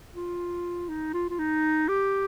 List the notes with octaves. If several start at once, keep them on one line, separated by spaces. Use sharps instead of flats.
F4
D#4
F4
F4
D#4
G4